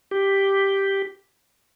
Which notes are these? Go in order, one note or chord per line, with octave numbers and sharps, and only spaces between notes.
G4